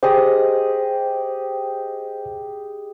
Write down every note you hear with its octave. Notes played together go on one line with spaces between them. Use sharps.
G4 G#4 C5 D#5